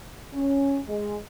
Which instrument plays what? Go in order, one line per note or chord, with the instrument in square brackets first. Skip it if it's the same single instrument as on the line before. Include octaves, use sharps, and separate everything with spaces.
[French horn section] C#4
G#3